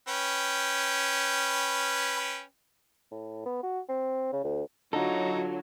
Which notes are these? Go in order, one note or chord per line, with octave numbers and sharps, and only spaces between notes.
C#4 B4 G5
A2
B3
F#4
C4
C#3
D2
D3 F#3 D#4 F4 A4